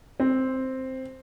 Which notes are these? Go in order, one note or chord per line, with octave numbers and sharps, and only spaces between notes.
C4